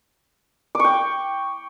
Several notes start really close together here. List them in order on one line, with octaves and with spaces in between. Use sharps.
D6 C#6 G5